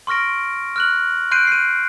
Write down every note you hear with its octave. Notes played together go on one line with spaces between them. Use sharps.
C6 C#6 F6 A#6 D7
F6 F#6 F#7
C6 F#6 G6 C7 D7 D#7
C7 D#7